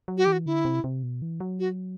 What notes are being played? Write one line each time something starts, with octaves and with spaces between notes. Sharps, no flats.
F#3
F#4
E3 G4
F#4
D3 E4
C3
C3
B2
E3
F#3
F#4